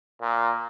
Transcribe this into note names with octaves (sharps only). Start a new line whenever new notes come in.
A#2